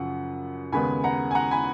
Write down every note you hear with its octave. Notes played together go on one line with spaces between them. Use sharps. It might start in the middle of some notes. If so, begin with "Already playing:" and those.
Already playing: F#2 C#3 F3 F#5
D#2 C#3 G#3 B3 G#5 B5
F#5 A#5
G#5
F#5 A#5
G#5 B5